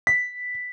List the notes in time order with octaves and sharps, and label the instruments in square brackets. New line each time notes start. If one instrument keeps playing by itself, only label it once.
[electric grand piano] B6